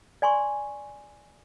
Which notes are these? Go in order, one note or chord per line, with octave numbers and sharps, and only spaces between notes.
D5 G#5 C6 C#6